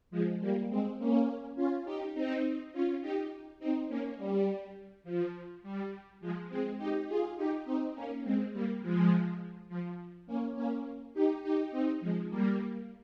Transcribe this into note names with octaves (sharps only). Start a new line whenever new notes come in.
F3 G#3
G3 A#3
G#3 C4
A#3 C#4
C#4 F4
D#4 G4
C4 D#4
C#4 F4
D#4 G4
C4 D#4
A#3 C#4
G3
F3
G3
F3 G#3
G#3 C4
D#4 G4
F4 G#4
D#4 G4
C4 D#4
A#3 C#4
G#3 C4
G3 A#3
F3 G#3
F3
A#3 C#4
A#3 C#4
D#4 G4
D#4 G4
C4 D#4
F3 G#3
G3 A#3